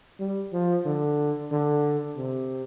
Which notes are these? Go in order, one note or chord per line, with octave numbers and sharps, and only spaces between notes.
G3
F3
D3
D3
C3